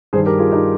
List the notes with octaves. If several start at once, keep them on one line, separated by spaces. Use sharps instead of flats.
G2 D#3 G#4 C5
G4 A#4
F4 G#4
D#4 G4